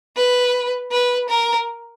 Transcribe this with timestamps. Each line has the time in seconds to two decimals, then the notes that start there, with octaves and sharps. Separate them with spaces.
0.16 B4
0.91 B4
1.29 A#4